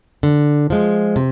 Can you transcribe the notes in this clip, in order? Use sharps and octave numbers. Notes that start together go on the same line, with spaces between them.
D3
F3 G#3
C3